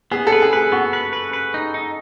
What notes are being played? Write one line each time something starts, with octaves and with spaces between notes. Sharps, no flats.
B3 G#4
A4
B4
G#4
G#4 B4
B3 F#4
B4
B4
B4
D#4
D#4